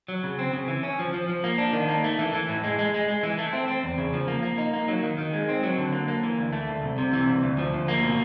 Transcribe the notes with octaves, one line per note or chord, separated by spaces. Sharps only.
F#3
C#3
C4
C#3
E3
C#4
F3
F3
F3
A#3
D4
D#3
A#3
A3
E3
E3
A2
G#3
G#3
G#3
G#3
E3
A3
C4
C4
E2
C#3
F3
A#3
A#3
D#4
A#3
F#3
D#3
D#3
G#3
C4
F#3
D3
A#3
A#3
E3
D2
A3
D2
C2
C3
E3
C2
D2
F3
D2
A#3
B2